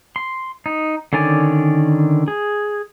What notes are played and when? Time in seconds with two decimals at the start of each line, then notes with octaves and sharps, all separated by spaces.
0.16 C6
0.66 D#4
1.13 D3 D#3 C#4 D5 G#5
2.28 G#4